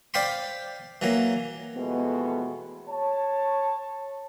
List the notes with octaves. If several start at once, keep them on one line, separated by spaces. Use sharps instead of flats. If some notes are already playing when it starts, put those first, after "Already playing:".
C5 D5 F5 G5 B5 C6
E3 F#3 A#3
F2 B2 E3 G#3 A3 B3
C#5 A5